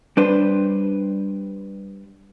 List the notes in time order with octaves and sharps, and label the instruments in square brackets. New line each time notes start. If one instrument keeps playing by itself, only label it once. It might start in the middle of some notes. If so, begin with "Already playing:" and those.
[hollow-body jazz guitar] G3 D4 B4 C5